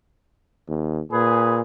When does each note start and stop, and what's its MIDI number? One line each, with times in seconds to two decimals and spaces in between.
0.68 1.02 39
1.12 1.62 46
1.12 1.62 68
1.12 1.62 71